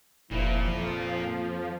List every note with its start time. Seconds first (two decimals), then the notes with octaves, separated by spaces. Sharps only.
0.31 F1 A#2 F3 E4
0.68 F2 F3